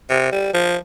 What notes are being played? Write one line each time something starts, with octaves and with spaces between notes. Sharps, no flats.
C3
G3
F3